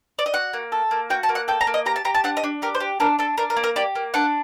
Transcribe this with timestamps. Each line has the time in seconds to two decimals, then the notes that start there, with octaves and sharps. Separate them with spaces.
0.19 D5
0.26 D#5
0.34 F#4 F#5
0.53 A#3
0.72 A4
0.91 A#3
1.10 F#4 G5
1.23 A5
1.29 A#3
1.35 F#5
1.48 A4 G5
1.61 A#5
1.67 A#3
1.74 D#5
1.86 G4 A#5
1.96 A5
2.05 G4 A#5
2.15 A5
2.24 D4 F#5
2.37 D#5
2.44 D4
2.62 G4 A#4
2.75 C5
2.80 G4
3.00 D4 A#4
3.19 D4 A4
3.38 D4 A#4
3.50 A#4
3.57 A#3
3.64 A#4
3.76 G4 D5
3.95 A#3
4.14 D4 F#5